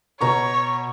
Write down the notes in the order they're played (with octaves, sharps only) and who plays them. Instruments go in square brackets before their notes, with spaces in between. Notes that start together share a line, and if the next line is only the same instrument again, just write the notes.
[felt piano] B2 A#5 C#6 [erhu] C#5